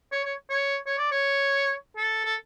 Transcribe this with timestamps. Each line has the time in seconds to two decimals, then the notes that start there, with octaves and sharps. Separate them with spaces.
0.12 C#5
0.25 C#5
0.50 C#5
0.87 C#5
0.98 D5
1.12 C#5
1.97 A4
2.25 A4